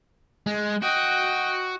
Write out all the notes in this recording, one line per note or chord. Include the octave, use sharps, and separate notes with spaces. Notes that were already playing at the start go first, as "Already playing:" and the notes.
G#3
F#4 D#5 G5